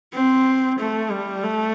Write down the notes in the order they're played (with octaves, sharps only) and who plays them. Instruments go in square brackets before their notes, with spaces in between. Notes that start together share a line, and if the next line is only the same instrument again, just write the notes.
[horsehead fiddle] C4
A3
G3
A3